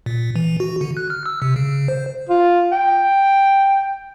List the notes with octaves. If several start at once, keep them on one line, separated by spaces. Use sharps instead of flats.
A#2
E3
F#4
D3
F#6
F6
E6
C3
C#3
C5
F4
G5